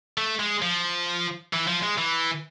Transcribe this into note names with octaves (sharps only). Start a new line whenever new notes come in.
A3
G#3
F3
E3
F3
G#3
E3